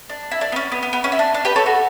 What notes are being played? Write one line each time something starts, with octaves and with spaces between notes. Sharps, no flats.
D4
E4
D4
B3
C#4
B3
B3
B3
C#4
E4
D4
D4
G4 B4
A4 C#5
F#4 A4